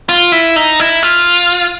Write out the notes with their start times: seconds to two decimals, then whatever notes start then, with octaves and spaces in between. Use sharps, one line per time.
0.09 F4
0.32 E4
0.56 D#4
0.80 E4
1.03 F4